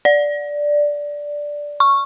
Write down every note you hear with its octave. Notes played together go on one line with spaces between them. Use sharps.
D5
C#6